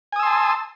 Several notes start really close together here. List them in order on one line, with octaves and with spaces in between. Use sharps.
G#5 D#6 E6 C6 A5